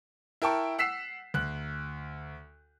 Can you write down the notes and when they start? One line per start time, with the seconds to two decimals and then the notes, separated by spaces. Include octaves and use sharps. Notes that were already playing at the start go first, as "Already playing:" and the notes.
0.42 E4 A#4 G5 A5 C#6
0.78 F#5 E6 B6 C7 E7
1.34 D2 F#6